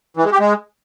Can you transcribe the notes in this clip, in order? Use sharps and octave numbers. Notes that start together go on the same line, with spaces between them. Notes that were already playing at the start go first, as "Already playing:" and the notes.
E3
G#3
G4
G#3